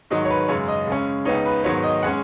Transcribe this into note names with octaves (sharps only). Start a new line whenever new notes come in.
G#2 D#3 F#3 D#5
C#5
B4
F#2 C#3 G#3 C#5
D#5
C#3 G#3 C#4
C#2 C#3 B3 D#4 C#5
B4
G#2 D#3 F#3 B3 C#5
D#5
G#3 C#4 F#5